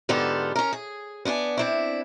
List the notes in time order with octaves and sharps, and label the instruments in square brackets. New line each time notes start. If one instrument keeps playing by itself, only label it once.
[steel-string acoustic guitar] G#2 D3 B3 F4 G4 A4
C#4 A#4
G#4
B3 D4 B4 G#5
C4 D4 E4